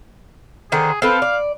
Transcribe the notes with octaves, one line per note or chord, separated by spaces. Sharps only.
D3 D#3 G#4 C5
C4 A4 B4 F5
D5